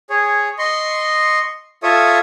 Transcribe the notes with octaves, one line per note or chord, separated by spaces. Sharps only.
G#4 C#5
D#5 C6 C#6
F4 A4 C#5 E5 C#6 D#6